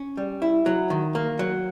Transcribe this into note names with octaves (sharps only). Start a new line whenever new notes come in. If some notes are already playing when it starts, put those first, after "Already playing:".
Already playing: C#4
G3
E4
F#3
D#3
A#3
F#3